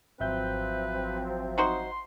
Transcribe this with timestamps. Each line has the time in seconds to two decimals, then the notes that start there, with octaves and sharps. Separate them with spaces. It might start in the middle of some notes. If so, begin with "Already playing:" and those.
0.20 G#1 F3 F#3 C4 B4 E5 G6
1.58 D#4 F#4 C5 C6